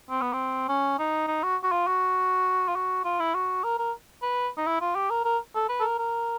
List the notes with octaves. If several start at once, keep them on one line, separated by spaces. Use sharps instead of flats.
C4
B3
C4
C#4
D#4
D#4
F#4
F#4
F4
F#4
F4
F#4
F4
E4
F#4
A#4
A#4
B4
D#4
E4
F4
G4
A#4
A#4
A4
B4
A4
A#4
A#4